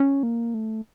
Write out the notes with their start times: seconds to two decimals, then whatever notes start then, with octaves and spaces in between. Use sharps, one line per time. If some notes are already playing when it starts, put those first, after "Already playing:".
Already playing: C#4
0.23 A#3
0.54 A3